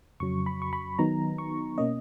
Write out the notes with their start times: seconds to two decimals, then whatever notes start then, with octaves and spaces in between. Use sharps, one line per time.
0.20 F2 C#3 F#3 C#6
0.46 B5
0.62 C#6
0.73 B5
0.99 D#3 F#3 B3 D#4 A#5
1.38 C#6
1.78 B2 A#3 C#4 D#5